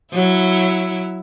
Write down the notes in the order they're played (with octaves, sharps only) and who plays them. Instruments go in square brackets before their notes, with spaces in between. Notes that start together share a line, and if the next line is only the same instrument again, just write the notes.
[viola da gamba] F#3 E4